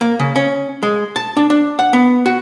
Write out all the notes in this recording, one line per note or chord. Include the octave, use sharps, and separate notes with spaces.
A#3
C#3
C#4
G#3
A5
D4
D4
F#5
B3
F#4